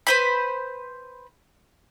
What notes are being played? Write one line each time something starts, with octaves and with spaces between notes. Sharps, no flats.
B4 C5 B5